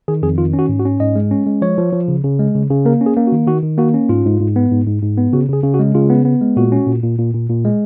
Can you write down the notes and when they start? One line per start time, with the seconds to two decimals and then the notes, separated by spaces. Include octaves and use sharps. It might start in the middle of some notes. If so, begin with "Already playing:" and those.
0.08 D#3 G#4
0.22 F2 G#4
0.38 D#3 F4
0.53 C#4
0.59 F#4
0.69 G#2
0.79 F#4
0.85 C#4
1.00 G#2 D#5
1.16 G#3
1.31 C#4
1.46 G#3
1.62 F3 C#5
1.78 F3
1.93 F3
2.08 C#3
2.24 C#3
2.39 G#3
2.55 C#3
2.70 C#3
2.85 A#3 A#4
3.01 C#4
3.06 G#4
3.16 A#3
3.27 F#4
3.32 D#3
3.47 D#3 F#4
3.63 D#3
3.78 A#3 F#4
3.94 C#4
4.09 G#2 F4
4.25 G#2
4.40 G#2
4.56 B3
4.71 G#2
4.87 G#2
5.02 G#2
5.17 B3
5.33 C#3 F#4
5.49 C#3 G#4
5.63 C#3
5.74 F#4
5.79 G#3
5.95 C#3 F4
6.10 B3
6.25 B3
6.41 G#3
6.57 A#2 F#4
6.72 C#4
6.87 A#2
7.03 A#2
7.18 A#2
7.34 A#2
7.50 A#2
7.65 G#3